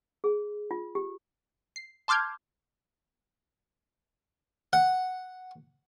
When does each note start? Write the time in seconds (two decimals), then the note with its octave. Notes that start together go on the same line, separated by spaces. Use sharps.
0.24 G#4
0.71 F4
0.95 G4
1.76 C7
2.08 A5 C6 D6 F6 G6 G#6
4.73 F#5